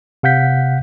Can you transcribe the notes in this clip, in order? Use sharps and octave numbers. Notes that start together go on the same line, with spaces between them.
C3 F5 F#5 G6 B6